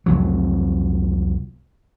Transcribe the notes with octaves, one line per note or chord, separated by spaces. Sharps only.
C2 F2 F#3